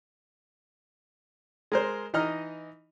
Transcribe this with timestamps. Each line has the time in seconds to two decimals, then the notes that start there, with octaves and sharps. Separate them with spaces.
1.72 G#3 A#4 C5
2.14 E3 D#4 D#5 A#5 F6